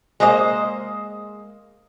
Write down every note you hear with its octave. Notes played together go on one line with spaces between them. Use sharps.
G#3 A#3 C5 D#5